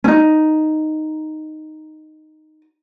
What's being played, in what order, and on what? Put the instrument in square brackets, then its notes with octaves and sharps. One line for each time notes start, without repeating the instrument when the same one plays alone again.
[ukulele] C#4 D#4